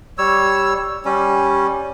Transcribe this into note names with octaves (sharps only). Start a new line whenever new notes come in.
G3 C#5 E6
G3 C#4